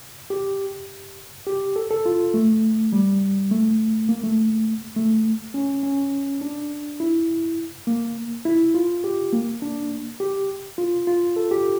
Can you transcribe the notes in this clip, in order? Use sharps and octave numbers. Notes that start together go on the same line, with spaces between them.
G4
G4
A4
A4
F4
A3
G3
A3
A#3
A3
A3
C#4
C#4
D4
E4
A#3
E4
F4
G4
A#3
D4
G4
F4
F4
A4
G4